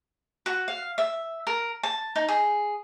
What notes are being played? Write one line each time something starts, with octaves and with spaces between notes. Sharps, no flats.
F#4
F5
E5
A#4
A5
D#4
G#4